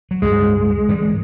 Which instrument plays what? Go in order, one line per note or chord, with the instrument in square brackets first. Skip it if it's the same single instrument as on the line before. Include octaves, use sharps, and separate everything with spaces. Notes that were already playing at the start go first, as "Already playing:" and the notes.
[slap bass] F#3
[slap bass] C#2 G2 [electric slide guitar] G#3
[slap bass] G#2 E3 G3